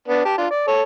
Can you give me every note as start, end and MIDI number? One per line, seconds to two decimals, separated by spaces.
0.08 0.25 59
0.08 0.25 62
0.25 0.36 67
0.25 0.36 81
0.38 0.47 62
0.38 0.47 65
0.51 0.67 74
0.67 0.82 69
0.67 0.82 73